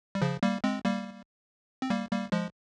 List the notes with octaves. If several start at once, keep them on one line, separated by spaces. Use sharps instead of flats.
G3
C#3 F3
G3 A#3
G#3 C4
G3 A#3
C4
G3 A#3
G3 A#3
F3 G#3